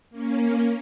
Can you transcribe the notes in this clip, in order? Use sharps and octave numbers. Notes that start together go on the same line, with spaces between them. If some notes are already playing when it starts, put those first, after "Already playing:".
A#3 C#4